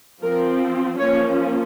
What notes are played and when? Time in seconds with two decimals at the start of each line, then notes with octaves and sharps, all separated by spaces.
0.22 F3 C4 A#4
0.99 F3 A#3 C#4 C#5